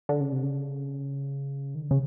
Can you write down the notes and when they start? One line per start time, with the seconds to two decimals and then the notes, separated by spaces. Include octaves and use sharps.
0.09 D3
0.21 C#3
0.32 C3
0.43 C#3
1.75 D#3
1.83 D3
1.91 C#3